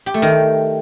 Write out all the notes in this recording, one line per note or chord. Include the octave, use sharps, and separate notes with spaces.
G4
A3
D#3